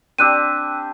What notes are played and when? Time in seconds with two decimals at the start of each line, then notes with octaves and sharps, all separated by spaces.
0.18 C4 D4 G4 E6 F#6 D#7